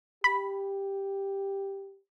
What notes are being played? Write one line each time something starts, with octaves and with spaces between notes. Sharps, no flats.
G4 B5